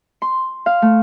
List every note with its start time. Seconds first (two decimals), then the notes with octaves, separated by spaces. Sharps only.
0.22 C6
0.66 F5
0.82 A3